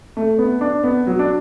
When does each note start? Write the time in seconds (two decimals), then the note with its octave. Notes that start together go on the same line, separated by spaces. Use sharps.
0.17 A3
0.38 B3
0.61 D4
0.84 B3
1.07 F#3
1.19 D4